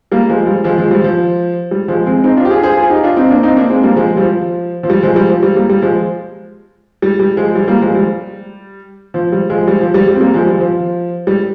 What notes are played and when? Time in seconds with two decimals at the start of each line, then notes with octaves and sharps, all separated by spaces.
0.12 G3 A#3
0.29 F3 G#3
0.47 G3
0.64 F3 G#3
0.78 F3 G#3
0.91 G3
1.04 F3
1.71 G3
1.88 F3 G#3
2.06 G#3 C4
2.24 C4 D#4
2.37 D4 F4
2.45 G4
2.50 F4 G#4
2.63 G#4 C5
2.77 F4 G#4
2.90 D#4 G4
3.03 D4 F4
3.17 C4 D#4
3.30 A#3 D4
3.43 C4 D#4
3.57 A#3 D4
3.70 G#3 C4
3.83 G3 A#3
3.96 F3 G#3
4.17 G3
4.23 F3
4.83 F3
4.90 G3
5.03 F3 G#3
5.16 G3
5.29 F3
5.43 G3
5.55 G3 A#3
5.70 G3
5.82 F3 G#3
7.02 G3
7.20 G3
7.37 F3 G#3
7.55 G3
7.68 G3 A#3
7.81 F3 G#3
7.95 G3
9.14 F3
9.32 G3
9.50 F3 G#3
9.68 G3
9.81 F3
9.94 G3
10.08 G3
10.15 C4
10.20 G3 A#3
10.34 F3 G#3
10.47 G3
10.61 F3
11.27 G3